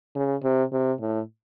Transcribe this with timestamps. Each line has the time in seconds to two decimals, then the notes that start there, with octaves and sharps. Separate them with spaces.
0.15 C#3
0.43 C3
0.72 C3
1.00 A2